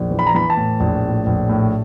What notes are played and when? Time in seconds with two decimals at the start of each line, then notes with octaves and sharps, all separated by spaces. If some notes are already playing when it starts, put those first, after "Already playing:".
Already playing: A#1
0.11 E3
0.19 B5
0.27 A#5
0.35 E3 B5
0.50 A5
0.57 A2
0.80 A#1
1.04 A2
1.26 A#1
1.49 A2